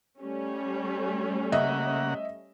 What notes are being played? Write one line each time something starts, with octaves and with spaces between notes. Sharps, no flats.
G3 A3 C#4
C#3 A#3 D#5 E5 F#5